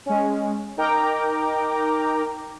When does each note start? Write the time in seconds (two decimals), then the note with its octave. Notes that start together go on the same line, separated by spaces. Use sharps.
0.06 G#3 C#4
0.77 D#4 A#4 G5 A#5 D6